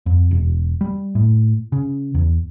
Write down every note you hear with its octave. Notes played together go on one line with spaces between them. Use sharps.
F2
E1
G3
A2
C#3
E2